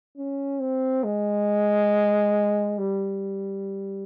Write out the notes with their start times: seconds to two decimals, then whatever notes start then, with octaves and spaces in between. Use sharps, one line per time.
0.17 C#4
0.61 C4
1.04 G#3
2.79 G3